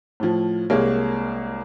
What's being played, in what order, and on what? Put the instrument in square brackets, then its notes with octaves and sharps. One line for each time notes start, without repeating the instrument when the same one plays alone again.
[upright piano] A2 F3
C2 G#3 A#3 G4 C#5